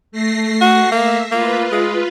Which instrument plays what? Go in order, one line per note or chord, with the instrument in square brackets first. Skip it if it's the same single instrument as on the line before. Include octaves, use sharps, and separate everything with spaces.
[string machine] A3 A#6 C7
[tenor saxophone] F#4
[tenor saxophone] A#3 [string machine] E5
[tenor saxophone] A#3 [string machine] F4 B4
[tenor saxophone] G#3